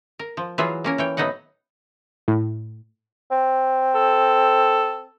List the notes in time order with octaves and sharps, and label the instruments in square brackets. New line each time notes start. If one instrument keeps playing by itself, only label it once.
[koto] A#4
F3
E3 F#3 F4 G#4 E5
A#3 C#4 A#4
E3 C#5 G5
A2 F#3 B3 D#4 D#5 F#5
[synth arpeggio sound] A2
[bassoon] C4
[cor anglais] A4